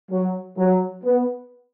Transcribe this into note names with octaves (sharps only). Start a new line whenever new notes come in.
F#3
F#3
B3